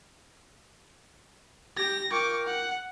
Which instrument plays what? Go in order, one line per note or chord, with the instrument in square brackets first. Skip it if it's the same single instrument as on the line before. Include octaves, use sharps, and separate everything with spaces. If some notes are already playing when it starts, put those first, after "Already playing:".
[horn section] G4 [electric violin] A#6
[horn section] F4 A#4 G5 [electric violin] C#6 D6
[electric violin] F#5